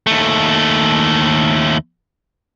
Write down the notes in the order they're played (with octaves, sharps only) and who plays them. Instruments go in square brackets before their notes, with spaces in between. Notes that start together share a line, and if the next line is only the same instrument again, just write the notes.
[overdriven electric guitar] D#2 A3